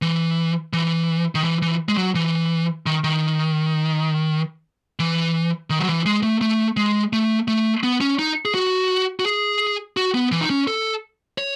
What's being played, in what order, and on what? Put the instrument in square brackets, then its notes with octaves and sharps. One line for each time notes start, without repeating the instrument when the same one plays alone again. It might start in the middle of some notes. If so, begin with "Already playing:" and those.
[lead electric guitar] E3
E3
D#3
E3
E3
G#3
F#3
E3
D#3
D#3
E3
D#3
F#3
E3
G#3
A3
A3
G#3
A3
A3
B3
C#4
D#4
G#4
F#4
F#4
G#4
F#4
B3
E3
D#4
C#4
A4
C#5